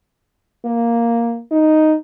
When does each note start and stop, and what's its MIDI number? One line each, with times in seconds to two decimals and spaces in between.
0.65 1.41 58
1.51 1.95 63